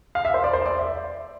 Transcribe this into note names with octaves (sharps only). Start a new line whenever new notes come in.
F5
E5
C5
D5
C5
D5
E5